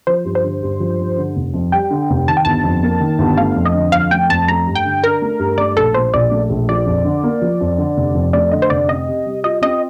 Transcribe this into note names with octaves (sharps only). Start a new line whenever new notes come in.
F3 C5
G2
C5
D3
G2
F3
G2
D3
F1
F2
G3 G5
D3
F1
D#3 A5
G5
G1 A5
F2
A#3
D#3
G1
A3 F5
F2
D#5
D3
F2 F5
A3 G5
F2 A5
A3 A#5
G2
G5
D3
D4 A#4
A3
G2
A3 D5
A#1 A4
A#2 C5
A#1 D5
A3
A#1
F3 D5
F2
D3
A#3
F3
F2
D3
F1
F2
A3 D5
D3 D#5
C5
F1 D5
C4 D#5
C3
G3
F4 D#5
C4 D#5